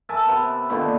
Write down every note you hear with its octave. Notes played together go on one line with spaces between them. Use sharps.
A#4 E5 G#5 A5
C3 B3
A#2 D3 D#3 B3